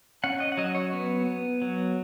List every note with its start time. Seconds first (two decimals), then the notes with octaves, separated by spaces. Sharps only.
0.24 C#4 F#5
0.40 D#5
0.52 F#5
0.57 F#3 D#5
0.75 C#5
0.93 B3
1.27 B3
1.62 F#3